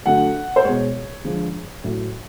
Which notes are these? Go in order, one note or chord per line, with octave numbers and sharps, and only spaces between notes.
D3 F#3 A3 F#5
C5
B2 G#3 C#5
D3 F3 G#3
A2 F#3 A3